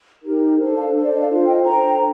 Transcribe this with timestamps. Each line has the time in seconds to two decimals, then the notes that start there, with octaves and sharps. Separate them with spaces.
0.22 D#4 G4 A#4
0.57 D4 A4 C5
0.76 F5 A5
0.94 D4 A4 C5
1.03 D5
1.11 D#5
1.20 D5 F5
1.29 F4 A4 C5
1.46 D#5 G5
1.64 D4 A4 C5 G5 A#5